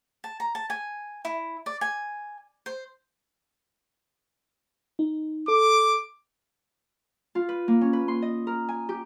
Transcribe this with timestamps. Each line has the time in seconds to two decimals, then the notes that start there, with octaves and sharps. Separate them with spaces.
0.24 A5
0.40 A#5
0.55 A5
0.70 G#5
1.25 E4
1.66 D5
1.81 G#5
2.66 C5
4.99 D#4
5.48 A4 D6
7.35 F4
7.49 B4
7.68 A#3
7.81 C#4
7.93 B4
8.08 C6
8.22 D#5
8.47 A#4
8.69 G#5
8.89 G4